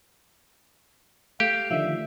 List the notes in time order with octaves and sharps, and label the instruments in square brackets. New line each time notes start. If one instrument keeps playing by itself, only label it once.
[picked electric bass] A3 [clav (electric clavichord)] G4 [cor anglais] F5
[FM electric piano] D3 D#3 F3 [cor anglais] E5